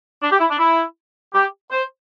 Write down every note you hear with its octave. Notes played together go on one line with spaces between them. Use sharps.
D4
G4
E4
D4
E4
G4
C5